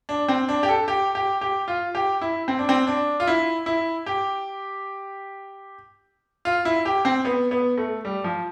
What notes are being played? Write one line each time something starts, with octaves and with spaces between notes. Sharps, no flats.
D4
C4
D4
G4
A4
G4
G4
G4
F4
G4
E4
C4
D4
C4
D4
F4
E4
E4
G4
F4
E4
G4
C4
B3
B3
A3
G3
F3